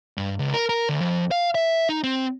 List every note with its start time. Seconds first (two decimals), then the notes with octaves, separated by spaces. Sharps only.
0.17 G2
0.39 C#2
0.54 A#4
0.69 A#4
0.89 D2
1.01 F2
1.31 F5
1.55 E5
1.89 D#4
2.04 C4